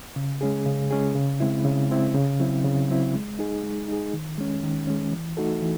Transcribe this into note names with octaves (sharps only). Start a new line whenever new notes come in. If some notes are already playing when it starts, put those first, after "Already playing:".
C#3
G#3 C#4 G#4
C#3
G#3 C#4 G#4
C#3
G#3 C4 E4
C#3
G#3 C4 E4
C#3
F#3 C4 E4
C#3
F#3 C4 E4
G#3
D#4 G#4
G#3
D#4 G#4
D#3
G#3 C#4
D#3
G#3 C#4
E3
A3 D#4 F#4 A4
E3